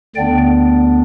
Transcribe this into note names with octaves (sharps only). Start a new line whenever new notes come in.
D2 D3 B3 D4 D5 G5